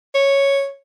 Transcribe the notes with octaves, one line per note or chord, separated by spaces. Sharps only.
C#5